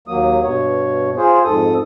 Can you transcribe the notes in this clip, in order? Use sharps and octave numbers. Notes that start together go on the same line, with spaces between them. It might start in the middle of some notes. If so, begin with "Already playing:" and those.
D#2 F#3 A#3 D#6
G2 B2 C#5
F4 G#4 C5
F2 G#2 A4 D#6